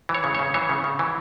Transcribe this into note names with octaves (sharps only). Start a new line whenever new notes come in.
E3
C#5
C#3
C#3 C#5
E3 C#5
C#3
C#3
E3